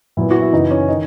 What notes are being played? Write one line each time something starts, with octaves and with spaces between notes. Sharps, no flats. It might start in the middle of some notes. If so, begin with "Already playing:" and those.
A#2 F#3 B3 E4
F#4
E4
F#2 C#3 E3 D#4
C#4
D#3 D#4